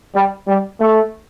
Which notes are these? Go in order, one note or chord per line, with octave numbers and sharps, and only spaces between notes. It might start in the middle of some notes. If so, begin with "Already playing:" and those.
G3
G3
A3